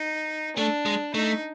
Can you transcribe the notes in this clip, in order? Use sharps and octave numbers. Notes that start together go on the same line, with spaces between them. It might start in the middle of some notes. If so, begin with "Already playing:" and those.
Already playing: D#4
A3 D4
G#3
A3 D#4